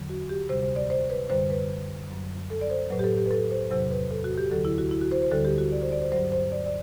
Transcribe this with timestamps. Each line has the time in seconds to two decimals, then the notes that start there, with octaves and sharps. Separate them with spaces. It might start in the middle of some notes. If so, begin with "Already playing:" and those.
Already playing: E2 D3 F#3
0.09 F#4
0.29 G4
0.49 D2 C3 G3 C5
0.63 C5
0.76 D5
0.90 C5
1.10 B4
1.30 F#2 D3 G3 C5
1.50 B4
2.10 F#2 F#3
2.50 A4
2.61 D5
2.70 C5
2.90 A2 F#3 B4
2.99 G4
3.04 A4
3.17 G4
3.26 B4
3.31 A4
3.51 C5
3.71 E2 C3 F#3 C5
3.91 B4
4.11 A4
4.24 F#4
4.38 G4
4.51 D2 D3 F#3 A4
4.65 E4
4.78 F#4
4.91 E4
5.01 F#4
5.12 C5
5.22 C5
5.31 D2 D3 G3 A4
5.45 G4
5.58 F#4
5.72 D5
5.82 C5
5.92 D5
6.02 C5
6.12 G2 F#3 C5
6.32 C5
6.52 D5
6.66 D5